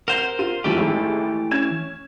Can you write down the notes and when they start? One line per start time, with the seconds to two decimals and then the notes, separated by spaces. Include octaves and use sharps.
0.08 A#4 C5 F#5 G6
0.39 F4 D#7
0.64 A#1 G2 E3 F3 A3 G4
0.77 A1 D#3 G#3
1.51 C#4 G#6 E7